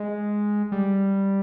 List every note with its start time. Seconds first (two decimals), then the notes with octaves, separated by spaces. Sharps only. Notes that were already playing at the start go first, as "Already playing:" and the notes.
Already playing: G#3
0.72 G3